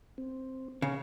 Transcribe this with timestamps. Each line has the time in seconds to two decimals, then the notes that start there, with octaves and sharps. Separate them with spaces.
0.18 C4
0.82 C#3 F5